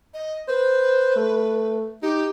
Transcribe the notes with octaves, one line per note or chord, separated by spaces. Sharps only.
D#5
B4 C5
A3
D#4 G4